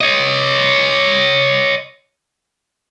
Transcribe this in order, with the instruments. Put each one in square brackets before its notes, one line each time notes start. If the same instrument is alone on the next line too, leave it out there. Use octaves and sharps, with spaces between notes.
[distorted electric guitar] C#5 D#5